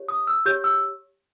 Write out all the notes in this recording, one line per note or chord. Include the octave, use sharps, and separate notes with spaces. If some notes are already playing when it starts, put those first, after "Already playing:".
Already playing: G4 C#5
D#6
E6
G4 C#5 G6
E6